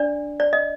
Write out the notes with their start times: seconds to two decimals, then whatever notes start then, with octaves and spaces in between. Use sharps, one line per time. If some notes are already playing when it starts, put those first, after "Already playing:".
Already playing: D4 D5
0.40 D5
0.53 D#5